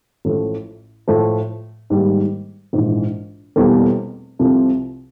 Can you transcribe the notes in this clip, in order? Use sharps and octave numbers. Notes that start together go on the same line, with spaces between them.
A1 A2 F3 A3
A2 F3 A3
G#2 D#3 G3 A#3
A#1 G#2 E3
F1 E2 B2 G3 A#3
C2 C3 F3 A3 C4